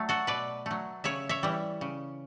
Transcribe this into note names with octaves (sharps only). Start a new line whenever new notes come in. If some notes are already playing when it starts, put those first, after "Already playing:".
Already playing: F#3 A3
F#4 A4
B2 B4 D5
F#3 A3
C#3 C#5 E5
C#5 E5
E3 G3
C#3